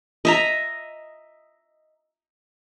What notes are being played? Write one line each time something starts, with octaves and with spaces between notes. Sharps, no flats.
D#5 E5 A#5